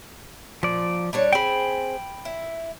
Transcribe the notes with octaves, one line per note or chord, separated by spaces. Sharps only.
A#2 F3 D5
G3 D4 C#5
C4 G#4 G5 B5
E4